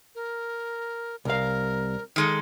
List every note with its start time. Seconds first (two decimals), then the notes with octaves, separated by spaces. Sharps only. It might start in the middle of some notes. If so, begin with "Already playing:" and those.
0.15 A#4
1.25 C2 A#4 F5
2.16 D#3 G#3 A4